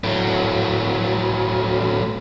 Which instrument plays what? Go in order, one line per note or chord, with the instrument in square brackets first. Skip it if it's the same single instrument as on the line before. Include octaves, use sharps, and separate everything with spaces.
[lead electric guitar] A2 F#3